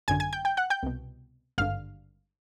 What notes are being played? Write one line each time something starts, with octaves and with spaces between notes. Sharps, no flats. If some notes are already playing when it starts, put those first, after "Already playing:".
G#1 F#2 D3 G#5 G#6
G#5 G#6
G5 G6
G5 G6
F#5 F#6
G5 G6
C2 B2
G#1 G2 D3 F5 F6